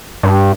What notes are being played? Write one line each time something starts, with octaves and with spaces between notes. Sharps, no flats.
G2